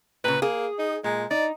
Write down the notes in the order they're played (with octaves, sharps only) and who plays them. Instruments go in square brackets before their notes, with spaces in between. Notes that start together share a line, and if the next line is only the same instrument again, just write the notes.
[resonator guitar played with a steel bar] A#2 C#3 [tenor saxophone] B4
[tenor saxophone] A#3 [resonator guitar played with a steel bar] G#4
[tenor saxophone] D#4
[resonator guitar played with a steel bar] A#2 [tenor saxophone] G#3
[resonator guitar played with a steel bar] D#4 [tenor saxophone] D5